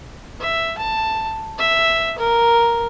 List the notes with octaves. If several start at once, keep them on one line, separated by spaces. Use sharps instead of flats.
E5
A5
E5
A#4